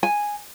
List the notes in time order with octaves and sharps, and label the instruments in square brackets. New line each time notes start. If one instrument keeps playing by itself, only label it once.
[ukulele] G#5